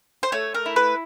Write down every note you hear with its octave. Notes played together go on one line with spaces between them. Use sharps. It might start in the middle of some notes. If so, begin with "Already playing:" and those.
C5
A3 C#5
A#4
E4
B4